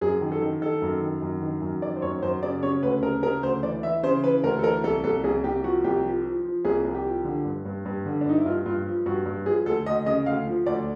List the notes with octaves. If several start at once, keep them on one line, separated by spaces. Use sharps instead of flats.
F#2 G#4
D#3
A4
D#3
D#3 A4
F#2
D#3
F#2
D#3
F#2
D#3 D5
C5
F#2 C#5
F#2 C5
C#3 D5
C#3 C#5
D2 B4
C#3 A#4
C#3 A#4
D2 C5
E3 D5
E3 E5
C#3 C5
E3 B4
D2 A#4
A4
E3 A#4
C2 A4
C2 A4
C2 G#4
C2 G4
F3 F#4
C2 G4
F3
F3
F3
C2 G#4
C2
G4
F3
D3
G2
G2
G2
D3
D4
G2 D#4
E4
G2 F4
G2 F4
F3
G2 F#4
G2
F3 G#4
D2 A4
D2 D#5
C#3 D#5
D2 F5
F3
D2 D5